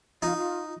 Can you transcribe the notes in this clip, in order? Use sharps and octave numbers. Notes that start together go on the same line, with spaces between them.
D#4 F4
F4